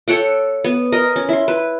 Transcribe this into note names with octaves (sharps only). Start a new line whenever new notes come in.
A4 C#5 F#5 G5
B3
A#4 D#5
C#4
E4 C6
B4